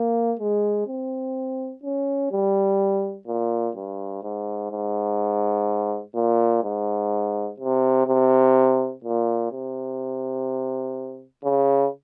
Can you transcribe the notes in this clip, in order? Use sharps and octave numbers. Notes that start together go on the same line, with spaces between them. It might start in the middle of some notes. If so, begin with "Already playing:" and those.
Already playing: A#3
G#3
C4
C#4
G3
A#2
G2
G#2
G#2
A#2
G#2
C3
C3
A#2
C3
C#3